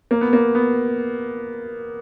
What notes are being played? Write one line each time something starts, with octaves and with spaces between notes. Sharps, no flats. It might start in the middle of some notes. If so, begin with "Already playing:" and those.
A#3
B3
A#3
B3